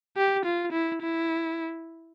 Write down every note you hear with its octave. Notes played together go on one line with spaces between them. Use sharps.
G4
F4
E4
E4